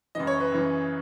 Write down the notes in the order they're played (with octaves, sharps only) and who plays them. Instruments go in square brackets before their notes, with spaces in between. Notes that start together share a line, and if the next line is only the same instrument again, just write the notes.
[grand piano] F#2 C#3 E3 D#5
C#5
B4
F#2 C#3 E3